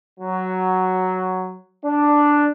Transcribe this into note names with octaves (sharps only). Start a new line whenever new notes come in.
F#3
D4